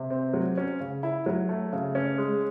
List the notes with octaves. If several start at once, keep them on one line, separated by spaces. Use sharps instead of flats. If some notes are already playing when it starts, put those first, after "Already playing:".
Already playing: C3
C4
F#3
C#4
C#3
E4
F#3
A3
C#3
C#4
G#3